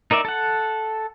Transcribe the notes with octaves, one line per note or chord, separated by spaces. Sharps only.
D#4 A#4 D5 E5
A4 F#5